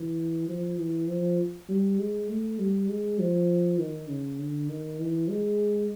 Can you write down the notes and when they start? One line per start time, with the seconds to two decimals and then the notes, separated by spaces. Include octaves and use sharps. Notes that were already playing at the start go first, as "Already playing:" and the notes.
Already playing: E3
0.49 F3
0.78 E3
1.08 F3
1.69 G3
1.99 G#3
2.29 A3
2.59 G3
2.89 G#3
3.19 F3
3.79 D#3
4.09 C#3
4.40 D3
4.69 D#3
4.99 E3
5.29 G#3